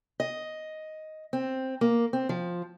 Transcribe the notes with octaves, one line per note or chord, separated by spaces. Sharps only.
D#5
C4
A#3
C4
F3